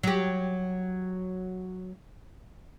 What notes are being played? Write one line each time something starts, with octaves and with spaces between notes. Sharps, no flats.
F#3 G4